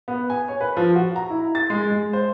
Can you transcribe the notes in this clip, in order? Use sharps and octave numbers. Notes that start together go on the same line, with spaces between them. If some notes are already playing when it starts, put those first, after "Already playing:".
B3
G#5
C#5
B4
F3
F#4
A#5
E4
A6
G#3
G#3
C5